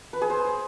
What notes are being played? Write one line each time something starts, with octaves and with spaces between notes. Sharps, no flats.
B4
G#4
C5